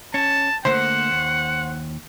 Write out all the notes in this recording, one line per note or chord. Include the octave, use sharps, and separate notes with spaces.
C#4 A5
D3 A3 A#3 C5 F#5
D#2